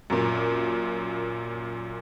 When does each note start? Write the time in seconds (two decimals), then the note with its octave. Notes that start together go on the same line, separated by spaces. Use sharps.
0.10 F#2 A#2